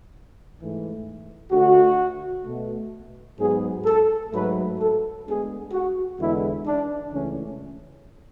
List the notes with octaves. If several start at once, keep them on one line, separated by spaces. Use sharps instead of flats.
G#2 E3 A3
D2 D3 A3 F#4
B2 A3
G#2 F#3 B3 G#4
A4
G#2 F#3 A3 B4
A4
D2 D3 G#3 B3 G#4
F#4
E2 D3 G#3 B3 E4
D4
C#2 C#3 E3 A3 C#4